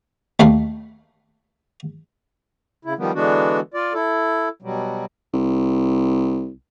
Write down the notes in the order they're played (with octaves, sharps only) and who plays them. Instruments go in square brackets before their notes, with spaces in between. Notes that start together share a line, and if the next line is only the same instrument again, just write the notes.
[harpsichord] D#2 A3 F5 B5
[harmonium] C#3 E4
D#3 F3 G3 B3
D3 E3 G#3 B3 D4 F#4
F4 D5
E4 A4
B2 F#3 G3
[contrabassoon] C2